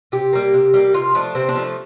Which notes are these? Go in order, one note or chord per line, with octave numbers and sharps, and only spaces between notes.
C3 G4
G3 A#3
C3
G3 A#3
C3 F4
F3 A3 D4
C3 C4
D4
F3 A3